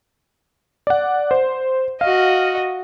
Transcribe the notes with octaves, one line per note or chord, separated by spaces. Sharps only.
D5 F#5
C5
F#4 D#5 F5